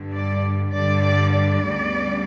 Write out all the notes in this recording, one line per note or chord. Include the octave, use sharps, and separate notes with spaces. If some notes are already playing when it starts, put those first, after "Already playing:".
Already playing: G2 D3 G3
D5
G2 D3 G3 D5
D5
D5
D2 C#3 G3 B3